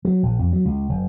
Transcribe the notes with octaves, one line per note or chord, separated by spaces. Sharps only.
F#3
A#1
F2
F#3
C#2
F#1